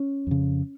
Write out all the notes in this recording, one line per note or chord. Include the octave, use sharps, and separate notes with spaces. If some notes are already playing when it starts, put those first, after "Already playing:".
Already playing: C#4
F2 C#3